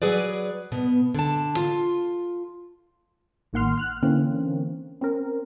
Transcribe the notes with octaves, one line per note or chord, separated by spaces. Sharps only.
F#3 G#4 B4 D5
B2 B3
D3 A5
F4
A1 D#3 A#3 F#5 C6 F6
F6 F#6
D3 E3 A#3 C4 C#4
C4 C#4 A#4